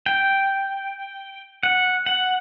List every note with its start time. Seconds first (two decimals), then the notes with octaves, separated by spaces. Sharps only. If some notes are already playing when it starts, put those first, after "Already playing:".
0.06 G5
1.63 F#5
2.06 F#5